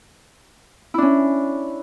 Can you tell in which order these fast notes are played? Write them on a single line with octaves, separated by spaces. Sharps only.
E4 D4 C#4